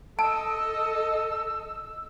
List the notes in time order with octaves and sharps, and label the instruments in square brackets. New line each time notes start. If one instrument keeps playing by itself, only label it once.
[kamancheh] A4 D#5 [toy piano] A5 [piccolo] E6